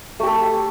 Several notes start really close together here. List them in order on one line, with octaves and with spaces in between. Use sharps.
A3 G4 A4